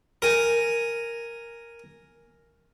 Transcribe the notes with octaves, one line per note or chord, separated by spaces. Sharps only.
A#4 G#5